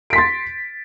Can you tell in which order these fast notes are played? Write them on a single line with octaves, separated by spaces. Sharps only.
D7 B6 C6 A6